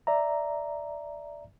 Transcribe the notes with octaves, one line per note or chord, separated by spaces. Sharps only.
D5 E5 A#5